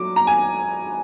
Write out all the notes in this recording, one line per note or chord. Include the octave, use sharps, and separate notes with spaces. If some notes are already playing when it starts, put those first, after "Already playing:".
Already playing: F#3 D6
A#5
G#5